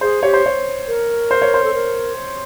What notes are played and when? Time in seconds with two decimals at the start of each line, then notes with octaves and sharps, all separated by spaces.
0.01 G#4 C5
0.23 G4 C#5
0.34 C5
0.46 C#5
0.88 A#4
1.31 C5
1.42 C#5
1.54 C5
1.64 A4
1.74 A#4